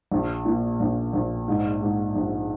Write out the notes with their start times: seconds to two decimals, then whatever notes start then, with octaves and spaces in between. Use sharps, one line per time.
0.12 A#1
0.45 A#2
0.80 A#1
1.13 A#1
1.48 G#2
1.81 G#2
2.16 A#1